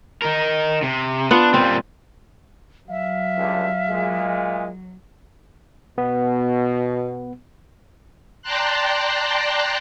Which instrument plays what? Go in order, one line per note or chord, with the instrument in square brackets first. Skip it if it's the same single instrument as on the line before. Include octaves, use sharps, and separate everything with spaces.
[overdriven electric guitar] D#4 A#4
C3
[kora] B3 F4 F#5 [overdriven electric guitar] D4
[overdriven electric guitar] A#2 G3 [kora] C4
[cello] F#3 [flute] E5 [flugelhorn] F5
[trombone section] C#2 G2 D3
A#2 G#3
[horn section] B2 [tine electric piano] B3
[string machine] D5 G5 A5 A#5 C6 F#6